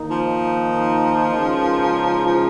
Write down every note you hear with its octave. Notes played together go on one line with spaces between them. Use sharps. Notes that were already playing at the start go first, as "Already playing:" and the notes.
Already playing: D#3 A#3 D#4
F3
C#2 C#3 G#3 D#4 A#4
F3